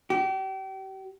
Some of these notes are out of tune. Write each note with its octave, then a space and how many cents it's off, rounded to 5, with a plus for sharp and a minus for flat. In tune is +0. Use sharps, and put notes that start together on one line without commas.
G4 -35